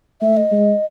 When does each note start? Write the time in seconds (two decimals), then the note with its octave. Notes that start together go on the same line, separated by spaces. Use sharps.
0.21 A3 E5
0.37 D#5
0.51 G#3